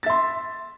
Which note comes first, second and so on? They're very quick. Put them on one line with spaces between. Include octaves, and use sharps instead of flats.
A6 E5 C6